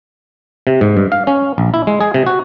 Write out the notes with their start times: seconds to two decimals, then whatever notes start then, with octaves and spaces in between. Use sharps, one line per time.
0.67 C3
0.81 G#2
0.97 G2
1.12 F5
1.27 C#4
1.58 A#1
1.74 E4
1.87 G#3
2.01 G#4
2.14 C3
2.26 F#4